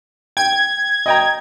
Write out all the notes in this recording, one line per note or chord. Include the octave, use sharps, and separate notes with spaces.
G5 G#6
D#5 G5 A#5